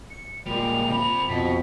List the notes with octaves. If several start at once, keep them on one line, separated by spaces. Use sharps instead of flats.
C#7
A#2 G3 G#3 F7
C3 B5
F2 B2 B6